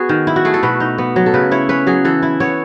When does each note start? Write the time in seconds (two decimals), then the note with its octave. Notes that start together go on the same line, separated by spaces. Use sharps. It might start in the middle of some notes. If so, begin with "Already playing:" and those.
Already playing: B3 F#4 G#4
0.09 D#3
0.27 E4
0.36 F#4
0.45 A3 G#4
0.54 A4
0.63 B2 B4
0.80 D#4
0.98 B3
1.16 F#3
1.26 A4
1.34 C#3 B4
1.51 E4 C#5
1.69 C#4 B4
1.87 F#3 G#4
2.05 E3 A4
2.22 E4
2.40 B3 C#5